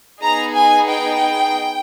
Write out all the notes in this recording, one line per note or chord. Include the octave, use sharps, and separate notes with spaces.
B3 D#4 G#4 A#5
G#5
G5